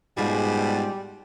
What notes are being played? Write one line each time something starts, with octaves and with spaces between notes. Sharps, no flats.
G#2 B2 G3 G#3 F4 G#4